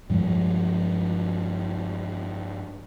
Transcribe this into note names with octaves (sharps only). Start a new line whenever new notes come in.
G2 F3 G3 G#3